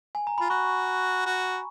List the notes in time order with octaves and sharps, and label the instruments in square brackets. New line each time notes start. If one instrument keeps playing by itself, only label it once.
[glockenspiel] G#5
A#5
[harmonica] F4 [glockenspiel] B5
[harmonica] F#4 [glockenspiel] C#6
[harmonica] F#4